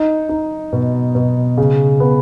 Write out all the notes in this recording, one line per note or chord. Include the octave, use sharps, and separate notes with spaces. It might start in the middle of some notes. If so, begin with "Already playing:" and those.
Already playing: D#4
D#4
B2
B2
C#3
B3